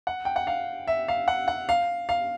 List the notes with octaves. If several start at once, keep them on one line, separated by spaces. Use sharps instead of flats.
F#5
G5
F#5
F5
E5
F5
F#5
F#5
F5
F5